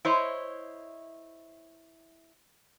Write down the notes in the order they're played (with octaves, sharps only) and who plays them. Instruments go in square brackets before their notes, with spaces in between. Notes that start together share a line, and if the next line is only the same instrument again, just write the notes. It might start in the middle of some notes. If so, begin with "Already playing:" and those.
[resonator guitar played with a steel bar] E4 C5 C#5 D#5